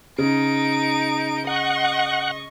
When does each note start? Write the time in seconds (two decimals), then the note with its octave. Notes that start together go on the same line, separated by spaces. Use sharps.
0.18 C#3 D#4 D7
1.47 D#5 F#5 C#6